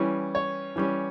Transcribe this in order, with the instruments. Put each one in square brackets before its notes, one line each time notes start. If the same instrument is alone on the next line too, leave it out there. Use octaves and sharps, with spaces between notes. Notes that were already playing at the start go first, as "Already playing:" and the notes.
Already playing: [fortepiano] E3 G3 C#4
C#5
E3 G3 C#4